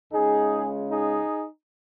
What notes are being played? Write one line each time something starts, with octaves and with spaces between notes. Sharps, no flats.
C#2 C#3 G#3 D#4 G#4
D#4 G#4